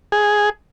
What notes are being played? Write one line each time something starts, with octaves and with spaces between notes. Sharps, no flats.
G#4